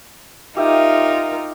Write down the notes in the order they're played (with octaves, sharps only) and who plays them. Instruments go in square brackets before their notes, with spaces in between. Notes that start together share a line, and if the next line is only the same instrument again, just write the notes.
[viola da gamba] D#4 F4 A#4 [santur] G4 E5 G5